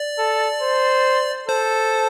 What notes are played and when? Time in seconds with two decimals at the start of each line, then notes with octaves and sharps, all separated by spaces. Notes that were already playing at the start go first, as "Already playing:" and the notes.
Already playing: D5
0.19 A4
0.62 C5
1.48 A4 C5